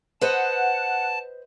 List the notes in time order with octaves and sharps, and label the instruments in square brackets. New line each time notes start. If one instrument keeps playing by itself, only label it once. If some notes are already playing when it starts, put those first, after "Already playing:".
[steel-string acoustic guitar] B4 C5 D#5 [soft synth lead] F#5 [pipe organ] A5